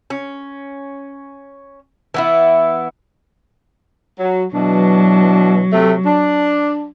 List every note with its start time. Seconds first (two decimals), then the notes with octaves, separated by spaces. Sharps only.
0.10 C#4
2.14 E3 B3 E4
4.19 F#3
4.54 B2 E3 F#3 D4
5.73 C3 A3
6.06 D4